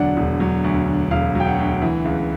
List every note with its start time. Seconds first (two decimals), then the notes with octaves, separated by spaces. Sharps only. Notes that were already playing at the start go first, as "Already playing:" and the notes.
Already playing: E1 D2 D3 F#3 D5 F#5
0.17 E1
0.40 F#3
0.64 D2
0.88 D3
1.11 E1 F5
1.35 F#3 G5
1.47 F#5
1.59 D2
1.82 E3
2.05 C#2